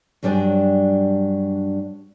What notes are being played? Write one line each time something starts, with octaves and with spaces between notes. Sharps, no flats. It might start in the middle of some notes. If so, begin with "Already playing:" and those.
G2 F#3 G3 D4 D5 G#5